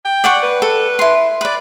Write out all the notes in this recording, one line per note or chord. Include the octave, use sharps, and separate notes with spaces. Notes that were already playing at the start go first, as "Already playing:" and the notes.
G5
D5 F#5 C#6
B4
A4
E4 C6
B4 D5